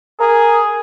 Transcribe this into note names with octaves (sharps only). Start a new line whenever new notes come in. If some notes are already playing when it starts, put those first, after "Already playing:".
G#4 A#4